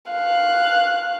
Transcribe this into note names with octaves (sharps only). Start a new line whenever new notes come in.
F5 F#6